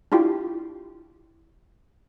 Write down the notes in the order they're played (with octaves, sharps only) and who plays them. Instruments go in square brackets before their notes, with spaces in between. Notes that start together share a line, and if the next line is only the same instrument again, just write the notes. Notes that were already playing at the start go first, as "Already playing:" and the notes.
[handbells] D4 E4 F4 G4 G5